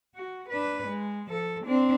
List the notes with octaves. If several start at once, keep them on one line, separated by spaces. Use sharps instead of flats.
F#4
D4 B4
G#3
F3 A4
C4 D4